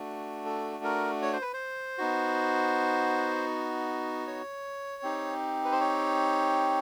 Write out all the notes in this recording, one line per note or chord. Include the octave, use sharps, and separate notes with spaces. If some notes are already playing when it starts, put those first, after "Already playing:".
Already playing: A3 D4 F#4
A4
A#4
C#5
C5
B4
C5
B3 D#4 F#4
C#5
C4 D#4 G4
B4
C5
C#5